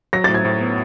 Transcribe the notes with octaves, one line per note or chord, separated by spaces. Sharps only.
F#3 A#6
A2 A6
G#6
A2
B3